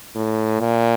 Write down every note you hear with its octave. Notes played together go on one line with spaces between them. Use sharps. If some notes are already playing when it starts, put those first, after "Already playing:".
A2
A#2